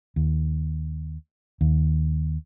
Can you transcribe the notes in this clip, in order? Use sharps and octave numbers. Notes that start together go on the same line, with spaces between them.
D#2
D#2